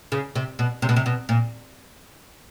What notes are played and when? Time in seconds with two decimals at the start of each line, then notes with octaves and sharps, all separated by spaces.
0.12 C#3
0.35 C3
0.59 B2
0.82 C3
0.89 B2
0.96 C3
1.06 B2
1.29 A#2